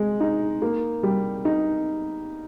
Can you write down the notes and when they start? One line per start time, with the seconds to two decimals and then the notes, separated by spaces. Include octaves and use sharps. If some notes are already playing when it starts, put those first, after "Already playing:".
Already playing: G#3
0.20 D#4
0.62 A#3
1.03 G3
1.45 D#4